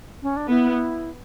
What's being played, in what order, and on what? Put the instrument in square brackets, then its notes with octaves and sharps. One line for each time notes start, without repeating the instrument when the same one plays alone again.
[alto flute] C#4
D4
[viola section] B3 [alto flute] E4